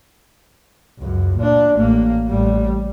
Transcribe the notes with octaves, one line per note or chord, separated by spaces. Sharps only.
C#2 F#2
A#2 D4
A1 A#3
A1 G3